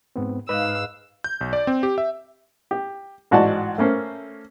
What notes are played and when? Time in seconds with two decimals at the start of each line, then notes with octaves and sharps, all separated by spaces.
0.16 G#2 B3 C4
0.49 G#2 B4 D#5 F5 E6 F#6
1.24 G6
1.41 B1
1.53 D5
1.67 C4
1.83 G4
1.98 E5
2.71 G4
3.31 A1 G#2 F#4 D5 D#5 A5
3.78 A3 A#3 C#4 C5